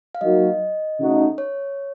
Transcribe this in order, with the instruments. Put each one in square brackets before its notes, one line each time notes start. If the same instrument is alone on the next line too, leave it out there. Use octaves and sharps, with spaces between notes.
[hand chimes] F5
[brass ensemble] F#3 A#3 D#4 F#4 [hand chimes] D#5
[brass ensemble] C#3 A3 D#4 F#4
[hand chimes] C#5